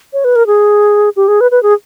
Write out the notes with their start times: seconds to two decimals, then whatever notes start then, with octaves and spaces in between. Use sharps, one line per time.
0.13 C#5
0.24 B4
0.36 A#4
0.47 G#4
1.16 G4
1.28 G#4
1.41 B4
1.51 B4
1.63 G#4